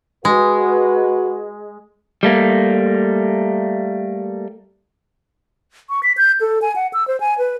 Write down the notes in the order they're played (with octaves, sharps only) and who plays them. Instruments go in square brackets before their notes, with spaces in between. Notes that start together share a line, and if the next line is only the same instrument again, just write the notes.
[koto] G#3 [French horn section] F#4 B4
[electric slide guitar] G3 A3 A#3
[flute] C#6
B6
G6
A4
G#5
F#5
E6
C5
G#5
B4